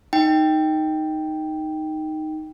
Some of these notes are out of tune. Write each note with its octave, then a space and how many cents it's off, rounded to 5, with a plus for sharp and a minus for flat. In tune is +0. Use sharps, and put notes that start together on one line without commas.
D#4 +0 G5 +0